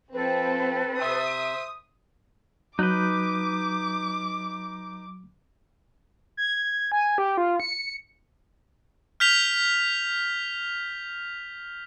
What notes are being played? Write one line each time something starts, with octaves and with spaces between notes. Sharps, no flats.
F3 C4 A4 B4 B5
C3 C5 E5 D#6
F#3 D#4 B4 D6 F#6 G6
G#6
G#5
G4
F4
C#7
F6 G6 B6 F7 G7